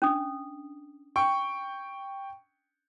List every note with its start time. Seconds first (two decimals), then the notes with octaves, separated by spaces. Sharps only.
0.02 C#4 D4 D#6
1.16 G5 C#6